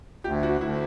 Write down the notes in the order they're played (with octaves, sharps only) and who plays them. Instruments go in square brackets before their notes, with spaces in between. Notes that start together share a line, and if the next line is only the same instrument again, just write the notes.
[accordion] D2 [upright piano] G4
[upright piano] F#4
[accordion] D2 [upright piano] E4